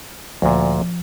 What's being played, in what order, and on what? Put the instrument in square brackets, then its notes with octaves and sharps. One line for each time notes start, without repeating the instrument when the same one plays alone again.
[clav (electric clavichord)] D2 A#2 [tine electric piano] F3